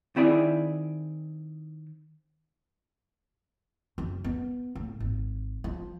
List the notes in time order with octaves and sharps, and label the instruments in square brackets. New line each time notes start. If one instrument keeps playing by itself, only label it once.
[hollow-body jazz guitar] D#3 C4 E4 G#4 D5
[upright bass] F#2
B3
A2
G#1
F3